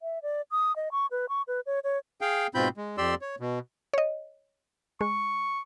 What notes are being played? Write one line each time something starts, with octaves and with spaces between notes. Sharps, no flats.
E5
D5
D#6
D#5
C#6
B4
C#6
B4
C#5
C#5
G#4 F5 G5
G#2 B2 C4 F4 B5 G6
G#3
F2 G4 D5 C6 E6
C#5
B2
C#5 D#5
G#3 C#6